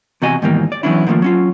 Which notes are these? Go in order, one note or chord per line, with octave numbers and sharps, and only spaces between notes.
E2 C3 F#4 G#4 D#5 G#5
G#2 B2 D#3 E3 G3 A#3
D5
E3 F#3 B3 C#4 D4 E4
D3 D#3 F3 A3 A#3
F#3 C#4 F4